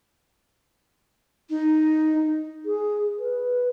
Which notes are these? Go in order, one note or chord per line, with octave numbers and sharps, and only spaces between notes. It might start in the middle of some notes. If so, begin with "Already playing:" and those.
D#4
G#4
B4